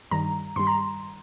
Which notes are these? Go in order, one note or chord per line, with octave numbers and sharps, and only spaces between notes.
G2 D#3 G3 A#5
G2 D#3 G3 C6
A#5